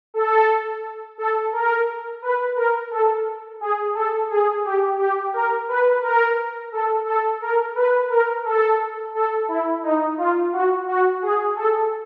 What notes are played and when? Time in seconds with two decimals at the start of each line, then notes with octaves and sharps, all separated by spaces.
0.14 A4
1.18 A4
1.53 A#4
2.22 B4
2.56 A#4
2.91 A4
3.61 G#4
3.94 A4
4.30 G#4
4.64 G4
4.99 G4
5.34 A#4
5.68 B4
6.02 A#4
6.72 A4
7.06 A4
7.41 A#4
7.75 B4
8.10 A#4
8.44 A4
9.15 A4
9.48 E4
9.83 D#4
10.18 F4
10.53 F#4
10.88 F#4
11.22 G#4
11.56 A4